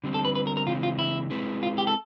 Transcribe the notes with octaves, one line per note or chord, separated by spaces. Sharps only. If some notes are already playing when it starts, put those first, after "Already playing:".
D3 G3 C4
A4
B4
B4
A#4
A#4
C#3 E3 G#3 C4 F4
F4
E4
G#3 C4 E4 G#4 B4
F4
G4
A4